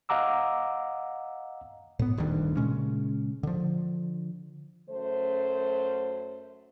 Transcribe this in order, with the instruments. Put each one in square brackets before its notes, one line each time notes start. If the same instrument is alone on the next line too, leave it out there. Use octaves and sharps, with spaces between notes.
[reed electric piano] D#5 F5 F#5 A#5 D6 E6
[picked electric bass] A2 B3
D#1 D2 G2 D#3
A#2 C#3 G#3 C#4
D3 F3
[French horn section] F#2 A3 C5